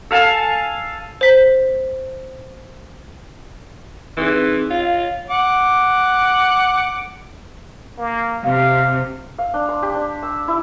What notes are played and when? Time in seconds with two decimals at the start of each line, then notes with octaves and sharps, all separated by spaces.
0.11 A4 F5 G#5 A5
1.21 C5 B6
4.17 E3 C4 D#4 G#4
4.70 F4 C#5 F5
5.30 F#5 D6
7.98 A#3
8.44 C3 F5
9.38 F5
9.54 D4
9.69 C6
9.83 G4
9.95 D4
10.22 E6
10.48 E4